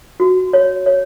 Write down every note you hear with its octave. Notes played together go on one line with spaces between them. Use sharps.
F#4
C#5
C#5